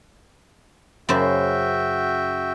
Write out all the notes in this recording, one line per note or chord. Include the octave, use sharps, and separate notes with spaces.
F#2 C#3 F#4 C5 E5 G5